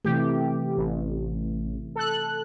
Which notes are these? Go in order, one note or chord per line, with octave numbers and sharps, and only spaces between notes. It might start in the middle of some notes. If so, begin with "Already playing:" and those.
C3 E3 A3 G4
A1
A4 F#6